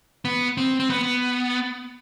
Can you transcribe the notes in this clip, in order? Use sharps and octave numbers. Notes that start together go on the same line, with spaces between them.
B3
C4
C4
B3